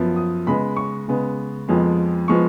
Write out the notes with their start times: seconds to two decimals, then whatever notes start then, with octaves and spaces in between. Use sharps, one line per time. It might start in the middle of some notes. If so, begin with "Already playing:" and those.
Already playing: F#2 F3 B3
0.16 D#6
0.47 C#3 G#3 B3 B5
0.76 C#6
1.08 C#3 G#3 B3
1.68 F2 F3 G#3 B3
2.28 F3 G#3 B3 C#6